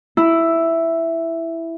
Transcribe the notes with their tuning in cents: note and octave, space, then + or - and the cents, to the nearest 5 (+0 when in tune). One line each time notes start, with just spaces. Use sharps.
E4 +5